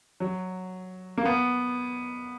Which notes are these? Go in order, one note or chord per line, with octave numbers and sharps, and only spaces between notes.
F#3
A#3
B3